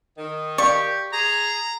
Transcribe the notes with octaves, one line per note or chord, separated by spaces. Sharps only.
D#3
G4 D5 F5 C#6
G#4 A#5